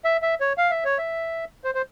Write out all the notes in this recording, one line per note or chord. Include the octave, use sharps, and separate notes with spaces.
E5
E5
C#5
F5
E5
C#5
E5
C5
C5